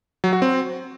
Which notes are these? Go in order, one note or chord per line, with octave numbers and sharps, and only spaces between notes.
F#3
F#4
C4